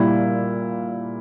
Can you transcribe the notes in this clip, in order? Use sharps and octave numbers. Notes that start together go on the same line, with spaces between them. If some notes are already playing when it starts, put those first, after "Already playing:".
Already playing: A#2 G3 E4